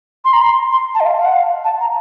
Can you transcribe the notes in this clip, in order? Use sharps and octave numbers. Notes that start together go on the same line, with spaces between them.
C6
A#5
C6
C6
A5
D#5
F5
F5
F#5
F5
A5
A#5